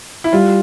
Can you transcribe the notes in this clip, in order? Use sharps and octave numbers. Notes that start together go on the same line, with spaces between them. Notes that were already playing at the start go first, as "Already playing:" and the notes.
E4
G3 F4